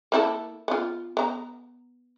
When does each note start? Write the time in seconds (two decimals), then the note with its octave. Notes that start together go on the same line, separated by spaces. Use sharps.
0.12 A#3 E4 A4
0.68 B3 F4
1.17 B3 A#5